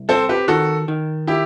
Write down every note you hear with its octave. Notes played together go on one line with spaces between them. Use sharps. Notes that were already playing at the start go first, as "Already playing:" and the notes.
Already playing: C2
C4 A4 C5
G4 B4
D#3 F#4 A4
D#3
E4 G4